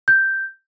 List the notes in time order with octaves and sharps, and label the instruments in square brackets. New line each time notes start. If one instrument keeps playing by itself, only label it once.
[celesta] G6